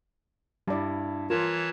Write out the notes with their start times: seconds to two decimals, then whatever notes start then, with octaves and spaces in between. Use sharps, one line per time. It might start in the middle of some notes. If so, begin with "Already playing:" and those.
0.68 G2 G3 E4 D5
1.30 E3 F4 A#4 C#5 A5